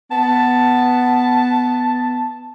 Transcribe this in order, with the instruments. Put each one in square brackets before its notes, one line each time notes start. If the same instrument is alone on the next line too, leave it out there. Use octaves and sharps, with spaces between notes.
[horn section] B3 A5